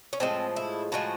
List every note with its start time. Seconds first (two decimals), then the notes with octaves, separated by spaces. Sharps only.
0.13 C#4
0.20 A2 F3 G#3 C4
0.56 E4
0.92 A2 F3 G#3 F#4